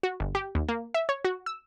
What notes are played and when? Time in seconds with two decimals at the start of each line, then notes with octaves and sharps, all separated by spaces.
0.03 F#4
0.20 G1
0.35 G4
0.55 D#2
0.69 A#3
0.94 E5
1.09 C#5
1.25 F#4
1.46 E6